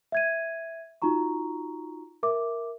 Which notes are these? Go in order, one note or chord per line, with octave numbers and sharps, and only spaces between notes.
E5 G#6 D#7
D#4 F4 F#4 A#5 C#6
A#4 E5 D6